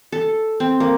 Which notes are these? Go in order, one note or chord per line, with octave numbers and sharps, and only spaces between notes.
A4
C4
A#3